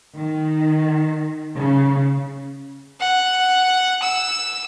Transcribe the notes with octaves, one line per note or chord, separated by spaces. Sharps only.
D#3
C#3
F#5
E6